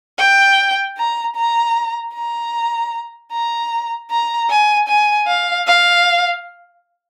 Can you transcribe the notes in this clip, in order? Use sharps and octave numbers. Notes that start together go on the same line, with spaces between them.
G5
A#5
A#5
A#5
A#5
A#5
G#5
G#5
F5
F5